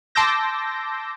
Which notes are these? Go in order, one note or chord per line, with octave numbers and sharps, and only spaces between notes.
A5 C6 D6 E6 G6 A#6